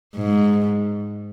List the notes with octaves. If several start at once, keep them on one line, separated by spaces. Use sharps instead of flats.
G#2